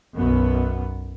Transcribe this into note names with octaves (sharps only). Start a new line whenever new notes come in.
B1 F#2 B3